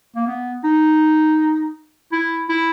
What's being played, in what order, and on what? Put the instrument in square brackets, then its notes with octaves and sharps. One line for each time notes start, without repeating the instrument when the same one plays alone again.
[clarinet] A#3
B3
D#4
E4
E4